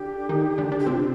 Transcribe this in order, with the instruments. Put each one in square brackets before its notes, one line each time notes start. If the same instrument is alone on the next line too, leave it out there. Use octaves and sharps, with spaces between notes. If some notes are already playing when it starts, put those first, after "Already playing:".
Already playing: [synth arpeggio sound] D3 D4 [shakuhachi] G4
[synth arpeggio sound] D#3 D#4
D3 D4
D3 D4
[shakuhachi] G4
[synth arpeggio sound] C3 C4 [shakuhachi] F4